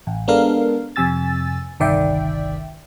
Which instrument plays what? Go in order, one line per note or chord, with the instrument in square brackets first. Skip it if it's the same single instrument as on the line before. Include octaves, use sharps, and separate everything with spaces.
[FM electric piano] A1
G#3 B3 D4 A4 A#4 F5
F2 C3 G#5 E6 A6
G1 C2 D#3 D5 E5 G5